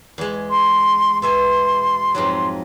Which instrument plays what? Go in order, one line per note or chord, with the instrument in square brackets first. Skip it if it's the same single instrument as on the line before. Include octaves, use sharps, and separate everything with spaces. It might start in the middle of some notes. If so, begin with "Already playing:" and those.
[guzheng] E2 G#3
[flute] C6
[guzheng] B2 E5 G#5 [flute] C6
[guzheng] F2 G#2 F#3